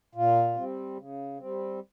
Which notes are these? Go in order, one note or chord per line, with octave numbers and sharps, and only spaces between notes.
A#2 F4
G3 C4
C#3
G3 C4